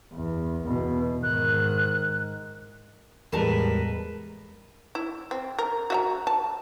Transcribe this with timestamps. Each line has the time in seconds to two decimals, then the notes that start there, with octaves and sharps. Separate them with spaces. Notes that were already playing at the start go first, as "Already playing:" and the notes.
0.14 E2
0.64 E2 B2
1.23 G#2 D#3 F#6
3.32 E2 A2 G3 G#3 A#4 B4 A5 A#5
4.95 E4
5.31 C4
5.59 A#4
5.90 F#4 E5 A#5
6.27 A5